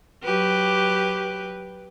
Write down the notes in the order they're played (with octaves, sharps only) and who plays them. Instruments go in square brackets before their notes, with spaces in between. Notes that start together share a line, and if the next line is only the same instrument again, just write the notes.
[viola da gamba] F#3 G4 B4